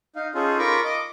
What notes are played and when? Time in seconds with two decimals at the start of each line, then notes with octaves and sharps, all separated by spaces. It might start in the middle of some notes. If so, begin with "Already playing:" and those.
0.16 D#4 F5
0.35 C#4 D#4 F4 G#4 A4
0.59 F4 A#4 A#5 B5 C#6 D6
0.84 D#5 D6